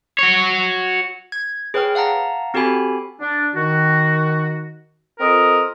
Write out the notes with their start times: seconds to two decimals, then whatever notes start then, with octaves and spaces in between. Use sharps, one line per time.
0.19 F#4 C#5
1.32 G#6
1.74 G#4 B4 C#5 G5 F6
1.95 F5 F#5 A5 A#5
2.54 C4 F#4 G4 A4 G#5 B5
3.20 D4
3.55 D#3 F#4
5.20 C4 F4 A4 A#4 D#5